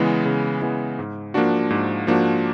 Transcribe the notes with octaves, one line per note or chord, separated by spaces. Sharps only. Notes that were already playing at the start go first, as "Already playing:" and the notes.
Already playing: C#3 E3 G#3 B3
C#3
E3 G#3 B3
G#2
F3 A#3 D4 F#4
G#2
F3 A#3 D4 F#4